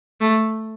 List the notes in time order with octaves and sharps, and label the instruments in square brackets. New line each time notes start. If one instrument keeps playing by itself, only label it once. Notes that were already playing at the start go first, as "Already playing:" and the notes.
[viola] A3